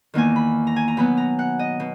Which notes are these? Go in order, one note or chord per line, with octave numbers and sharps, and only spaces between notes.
E2 D#3 A#3 G#5
B5
A#5
G#5
A#5
B2 F#3 B3 B5
A#5
F#5
D#5
B2